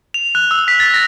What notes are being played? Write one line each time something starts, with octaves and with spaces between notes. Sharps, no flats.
F7
F#6
E6
B6
A6
A#6